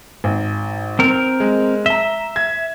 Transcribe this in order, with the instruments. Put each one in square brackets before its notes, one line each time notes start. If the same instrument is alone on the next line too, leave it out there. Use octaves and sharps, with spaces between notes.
[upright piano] G#1
[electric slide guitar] C4 A#4
[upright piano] G#3
[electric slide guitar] E5 [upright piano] A#5 G7
[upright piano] G#6